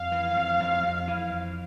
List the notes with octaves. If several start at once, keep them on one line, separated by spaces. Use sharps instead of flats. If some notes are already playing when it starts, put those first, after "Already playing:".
Already playing: F2 F5
E3
F2
F2
F2
E3
F2